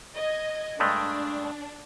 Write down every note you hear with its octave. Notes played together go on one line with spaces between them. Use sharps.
D#5 G#6
G2 G#3 A3 D4